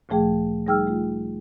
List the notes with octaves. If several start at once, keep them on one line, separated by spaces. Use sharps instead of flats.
D2 A#2 F3 A3 G#4 G5
G3 D#4 G#4 G5 E6 F6
A3 F4